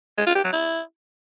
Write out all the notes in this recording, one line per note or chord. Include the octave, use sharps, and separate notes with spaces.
G#3
F4
G4
F#3
E4